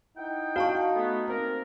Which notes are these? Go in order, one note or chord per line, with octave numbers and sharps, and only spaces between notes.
D#4 E4 F#5 G5
F#4 F5 A5 C#6
A3 B3
A#3 C4 A#4